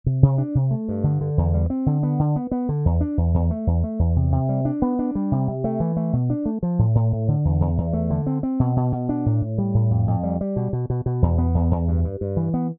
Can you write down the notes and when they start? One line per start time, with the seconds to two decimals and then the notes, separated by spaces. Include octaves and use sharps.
0.06 C3
0.23 C3
0.38 D4
0.55 C3
0.71 A3
0.88 G2
1.04 D3
1.21 D3
1.38 E2
1.54 G3
1.70 C4
1.86 D3
2.03 B3
2.19 D3
2.36 B3
2.51 B3
2.69 D3
2.85 E2
3.01 D4
3.17 E2
3.34 E2
3.51 A3
3.67 E2
3.84 A3
3.99 E2
4.16 C3
4.32 C3
4.49 G3
4.65 D4
4.82 B3
4.99 D4
5.15 G3
5.32 C3
5.48 C3
5.64 A3
5.80 E3
5.97 A3
6.13 B2
6.30 D4
6.46 A3
6.63 F3
6.79 A2
6.95 A2
7.12 A2
7.28 D3
7.45 E2
7.61 E2
7.78 E2
7.93 A3
8.10 D3
8.27 C4
8.43 C4
8.60 B2
8.76 B2
8.92 B2
9.09 D4
9.26 A2
9.42 A2
9.58 G3
9.74 A2
9.91 F2
10.07 F2
10.23 G3
10.41 G3
10.56 B2
10.73 B2
10.90 B2
11.06 B2
11.22 E2
11.38 B3
11.55 E2
11.71 E2
11.88 G2
12.04 G2
12.21 G2
12.37 E3
12.54 B3